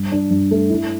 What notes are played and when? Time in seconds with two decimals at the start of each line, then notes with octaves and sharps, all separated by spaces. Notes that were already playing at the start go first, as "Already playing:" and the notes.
Already playing: G2
0.12 D4
0.30 G2
0.51 A3
0.70 E4